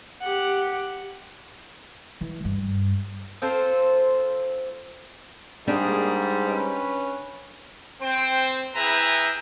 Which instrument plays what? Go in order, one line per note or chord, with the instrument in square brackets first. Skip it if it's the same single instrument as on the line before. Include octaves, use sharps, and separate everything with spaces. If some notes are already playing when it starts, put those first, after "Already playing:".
[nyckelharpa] G4 F#5
[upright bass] E3
G2
[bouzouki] C4 F4 A4 C5
[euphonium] G#2 [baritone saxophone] G3 [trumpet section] A#3 G#4 [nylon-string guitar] D4
[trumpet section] C#4 B4
C4 C5 G5
E4 G#4 B4 E5 G5 A#5